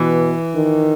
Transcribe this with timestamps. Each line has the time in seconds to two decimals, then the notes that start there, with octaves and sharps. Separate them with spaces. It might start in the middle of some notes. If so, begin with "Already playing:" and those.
Already playing: B2 E3
0.55 D#3